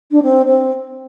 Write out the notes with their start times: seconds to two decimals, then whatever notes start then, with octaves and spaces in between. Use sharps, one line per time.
0.11 D4
0.22 C4
0.46 C4